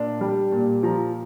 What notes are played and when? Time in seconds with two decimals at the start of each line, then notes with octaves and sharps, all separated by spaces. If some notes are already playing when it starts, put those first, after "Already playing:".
Already playing: A#2 D4
0.21 G3
0.52 A#2
0.83 F3 A#5